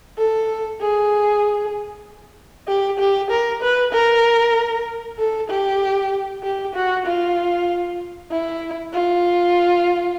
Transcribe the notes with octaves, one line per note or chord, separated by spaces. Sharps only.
A4
G#4
G4
G4
A#4
B4
A#4
A4
G4
G4
F#4
F4
E4
F4